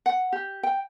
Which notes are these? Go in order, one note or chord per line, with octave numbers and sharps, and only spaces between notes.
F#5
G4
G5